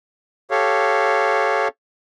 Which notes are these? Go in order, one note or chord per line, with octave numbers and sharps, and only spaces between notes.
G4 A4 C#5 F5